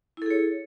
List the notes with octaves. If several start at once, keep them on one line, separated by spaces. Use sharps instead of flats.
E4 G#4 A4 C#5